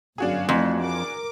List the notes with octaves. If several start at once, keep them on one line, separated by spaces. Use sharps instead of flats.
G1 F#2 D4 F#4 G#4 F5
F2 E3 A3 D#4
A#4 D6